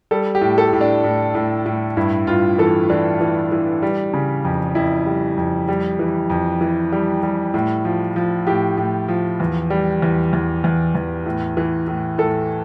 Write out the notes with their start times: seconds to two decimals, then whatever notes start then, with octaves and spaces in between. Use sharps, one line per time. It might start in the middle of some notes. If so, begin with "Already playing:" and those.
0.11 G3 A4
0.35 G4
0.41 A2
0.58 A4
0.73 A2
0.81 D4
1.04 A2
1.35 A2
1.66 A2
1.97 G2 E4
2.27 G2 F4
2.58 E3 A4
2.89 E3 D4
3.21 E3
3.52 E3
3.82 G3
4.14 C#3
4.45 F2
4.75 F2 E4
5.06 G3
5.37 F2
5.68 G3
5.99 E3
6.30 F2
6.61 E3
6.92 G3
7.23 G3
7.54 A2
7.85 F3
8.16 F3
8.47 A2 G4
8.77 A2
9.08 F3
9.40 E2
9.70 G3
10.02 E2
10.33 E2
10.64 E2
10.95 E2
11.26 A2
11.57 E3
11.88 A2
12.18 A2 A4